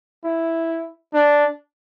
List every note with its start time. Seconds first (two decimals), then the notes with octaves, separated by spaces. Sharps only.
0.24 E4
1.14 D4